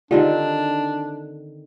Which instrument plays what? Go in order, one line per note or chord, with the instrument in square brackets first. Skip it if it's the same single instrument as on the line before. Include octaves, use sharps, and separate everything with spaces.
[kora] D3 D#3 C4 [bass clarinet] D4 [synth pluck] F4 G4 G#4